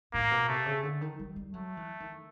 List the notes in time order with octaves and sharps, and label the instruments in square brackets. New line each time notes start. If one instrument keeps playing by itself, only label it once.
[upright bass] A2 [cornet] A#3
[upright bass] B2
[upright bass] C3 [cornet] A3
[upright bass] C#3
D3
D#3
G3
G3
[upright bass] F#3 [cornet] A3
[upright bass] E3
D#3